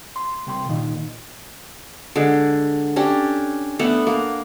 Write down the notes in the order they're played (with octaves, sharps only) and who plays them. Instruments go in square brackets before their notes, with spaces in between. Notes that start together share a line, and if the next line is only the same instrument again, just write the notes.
[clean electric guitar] C6
C2 G5 C6
A#2 D#3
[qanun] D3 G#3
C#4 D4 G4
A3 B3 D4 F#5
A#3